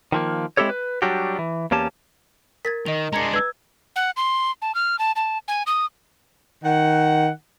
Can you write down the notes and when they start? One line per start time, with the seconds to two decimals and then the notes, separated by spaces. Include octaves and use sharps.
0.12 D#3 F3 A#3
0.57 G#3 C4 E4 G4 A4 C#5
0.69 B4
1.02 F#3 G3 D4 F#4 G4
1.39 E3
1.71 E2 A#3 C#4 G4 A5
2.65 A#4 G#6 A6 B6
2.86 D#3 D#5 F7
3.13 G#3 D4 A#5 G#6 C#7
3.33 B4 E6 G#6
3.96 F#5
4.17 C6
4.62 A5
4.75 F6
4.99 A5
5.16 A5
5.48 G#5
5.66 D#6
6.64 D#3 F#5